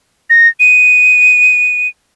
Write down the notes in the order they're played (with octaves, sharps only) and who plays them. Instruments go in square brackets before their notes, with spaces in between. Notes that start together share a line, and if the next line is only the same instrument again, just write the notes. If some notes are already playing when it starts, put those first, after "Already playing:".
[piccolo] A#6
D#7